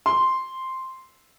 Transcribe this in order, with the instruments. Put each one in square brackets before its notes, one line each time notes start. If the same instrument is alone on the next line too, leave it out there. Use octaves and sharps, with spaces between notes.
[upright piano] C6